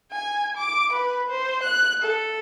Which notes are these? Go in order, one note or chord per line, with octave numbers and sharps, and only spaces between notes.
G#5
D6
B4
C5
F#6
A4